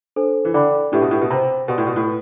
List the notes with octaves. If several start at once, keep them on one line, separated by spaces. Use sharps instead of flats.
D4 A4 C5
E3
D3 A4 D5 G5 B5 D6
A2 D4 G4 B4 E5
B2
A2
B2
C3 C5 G5 B5
B2 G4 D5 F5 C6
A2
B2
A2
B4